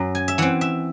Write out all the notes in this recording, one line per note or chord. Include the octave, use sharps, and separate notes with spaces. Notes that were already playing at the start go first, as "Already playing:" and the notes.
Already playing: F#2 F#3
G#5
E5
E3 C4 F#5
E5